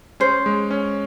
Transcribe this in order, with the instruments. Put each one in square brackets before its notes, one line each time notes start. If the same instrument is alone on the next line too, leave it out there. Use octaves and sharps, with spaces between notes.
[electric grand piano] C#4 [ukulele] C5
[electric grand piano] G#3
C#4